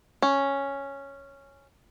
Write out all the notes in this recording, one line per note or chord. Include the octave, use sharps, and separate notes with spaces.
C#4